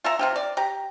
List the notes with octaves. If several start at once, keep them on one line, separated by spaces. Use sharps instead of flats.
F4 E5 A#5
C3 F4 G4
D5
G4 A#5